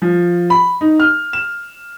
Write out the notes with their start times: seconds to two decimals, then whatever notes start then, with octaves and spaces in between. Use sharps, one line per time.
0.02 F3
0.50 B5
0.81 D#4
1.00 F6
1.33 E7